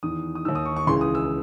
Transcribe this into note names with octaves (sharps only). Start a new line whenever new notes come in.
E2 D#3 D#6
D#6
D#2 D#3 E6
D#6
C#6
C#6
C#2 C#3 E3 C6
D#6
E6